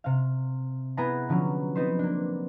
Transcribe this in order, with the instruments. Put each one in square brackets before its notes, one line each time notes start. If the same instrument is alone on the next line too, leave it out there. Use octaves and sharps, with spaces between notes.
[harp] C3 F5
B3 E4 G#4 F#5 A#5
D3 F3 F#3 C#4
B3 C4 D#4 B4 C5
A#3 D4